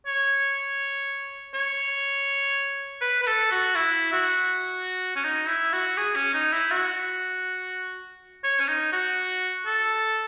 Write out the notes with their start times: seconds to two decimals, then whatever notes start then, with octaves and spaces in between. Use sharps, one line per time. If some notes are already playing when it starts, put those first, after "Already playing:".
0.07 C#5
1.54 C#5
3.01 B4
3.23 B4
3.27 A4
3.52 F#4
3.75 E4
4.13 F#4
5.16 C#4
5.24 D#4
5.48 E4
5.73 F#4
5.97 G#4
6.16 C#4
6.34 D#4
6.53 E4
6.71 F#4
8.44 C#5
8.60 C#4
8.68 D#4
8.92 F#4
9.66 A4